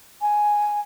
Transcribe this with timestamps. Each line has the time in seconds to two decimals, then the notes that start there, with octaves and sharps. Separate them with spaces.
0.22 G#5